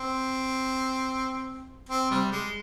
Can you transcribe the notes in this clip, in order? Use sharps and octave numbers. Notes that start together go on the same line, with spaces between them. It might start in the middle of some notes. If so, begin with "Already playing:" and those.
Already playing: C4
C4
C3 G3
G#3